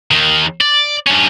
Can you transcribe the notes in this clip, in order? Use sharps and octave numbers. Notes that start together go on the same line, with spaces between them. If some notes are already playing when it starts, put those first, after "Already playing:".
D#2 D#3
D5
G2 C#4